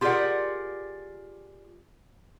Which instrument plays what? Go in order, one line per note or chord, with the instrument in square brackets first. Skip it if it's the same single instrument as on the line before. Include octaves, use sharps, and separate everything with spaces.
[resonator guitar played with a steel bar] F4 G4 G#4 A#4 D5 F#5